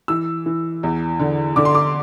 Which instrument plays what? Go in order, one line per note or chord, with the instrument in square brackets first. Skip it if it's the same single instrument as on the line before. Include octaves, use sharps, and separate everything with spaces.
[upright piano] E3 E6
E3
E2
D3
D3 D6
C6
D6